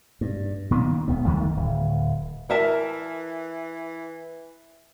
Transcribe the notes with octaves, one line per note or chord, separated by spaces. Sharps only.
G2
A#2 D#3 B3
D#1 C#2 B3
D2 D#3 G3 A3
D1
E3 A#4 E5 A5